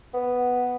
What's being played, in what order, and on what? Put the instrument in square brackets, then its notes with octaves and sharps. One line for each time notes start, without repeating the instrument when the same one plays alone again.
[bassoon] B3